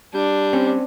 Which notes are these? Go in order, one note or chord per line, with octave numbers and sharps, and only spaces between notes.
G3 D4
C4 C#4